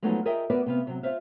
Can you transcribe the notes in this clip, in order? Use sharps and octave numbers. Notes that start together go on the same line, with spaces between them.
F3 F#3 G#3 A3 B3 D#4
F4 G#4 A#4 D#5 E5 G5
B3 F#4 A#4 B4 D5
C3 B3 F5
C3 F#3
F4 F#4 C5 E5 F5